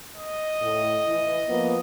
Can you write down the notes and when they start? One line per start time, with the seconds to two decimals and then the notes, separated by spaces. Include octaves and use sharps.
0.16 D#5
0.61 A2
1.08 E3 E4
1.48 F3 A#3 B3